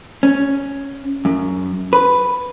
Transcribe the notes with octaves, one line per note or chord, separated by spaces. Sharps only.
C#4
F#2
B4